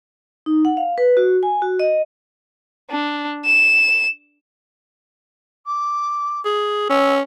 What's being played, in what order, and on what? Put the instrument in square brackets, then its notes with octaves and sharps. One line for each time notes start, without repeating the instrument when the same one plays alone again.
[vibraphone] D#4
F#5
F5
B4
F#4
G#5
F#4
D#5
[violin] D4
E7
[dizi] D6
[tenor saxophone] G#4
[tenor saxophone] C#4 [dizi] E6